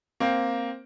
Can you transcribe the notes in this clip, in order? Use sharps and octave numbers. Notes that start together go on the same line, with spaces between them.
A#3 C4